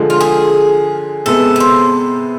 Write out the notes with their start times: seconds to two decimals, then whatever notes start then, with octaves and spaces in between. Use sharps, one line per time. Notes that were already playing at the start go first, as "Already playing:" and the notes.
Already playing: D3 F3 G#3
0.10 F4
0.21 G#4
1.26 C3 G#3 B3 A4
1.56 B4
1.60 C5